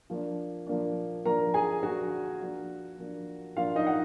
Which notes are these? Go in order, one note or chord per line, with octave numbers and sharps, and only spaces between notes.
F3 A#3 D4
F3 A#3 D4
F3 A#3 D4 A#4 A#5
G#4 G#5
F3 A#3 D4 F#4 F#5
F3 A#3 D4
F3 A#3 D4
F3 A#3 D4 F4 F5
D#4 D#5
F#5